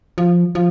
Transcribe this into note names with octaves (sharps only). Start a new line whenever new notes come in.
F3
F3